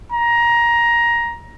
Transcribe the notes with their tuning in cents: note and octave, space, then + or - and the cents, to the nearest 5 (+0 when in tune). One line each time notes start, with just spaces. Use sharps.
A#5 +15